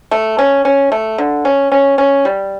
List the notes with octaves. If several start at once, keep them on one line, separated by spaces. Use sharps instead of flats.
A3
C#4
C#4
A3
D3
C#4
C#4
C#4
G3